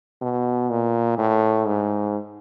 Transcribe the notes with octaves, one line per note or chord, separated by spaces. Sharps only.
B2
A#2
A2
G#2